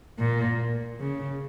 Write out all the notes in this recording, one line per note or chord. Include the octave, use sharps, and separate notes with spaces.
A#2
C#3